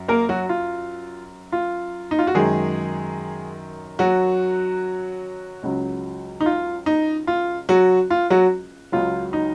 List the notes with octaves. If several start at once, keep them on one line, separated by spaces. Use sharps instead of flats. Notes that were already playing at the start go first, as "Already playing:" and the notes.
Already playing: F#2
A#3 A#4
F#3 F#4
F4
F4
D#4
F4
F#4
F#2 D#3 F#3 G#3 G#4
F#3 F#4
C#2 C#3 F#3
D#4
F4
D#4
F4
F#3 F#4
F4
F#3 F#4
C#2 C#3 F#3 F4
D#4